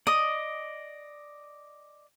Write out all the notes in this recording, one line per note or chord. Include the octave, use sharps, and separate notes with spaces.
D5 D#5 D#6